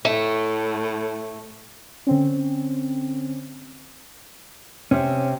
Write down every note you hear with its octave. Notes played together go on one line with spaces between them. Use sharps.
A2 A3
D3 C4 C#4
C3 C#4